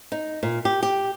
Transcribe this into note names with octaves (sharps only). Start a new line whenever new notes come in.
D#4
A#2
G4
G4